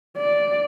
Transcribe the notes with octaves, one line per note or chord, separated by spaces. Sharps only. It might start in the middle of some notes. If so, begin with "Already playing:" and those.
D5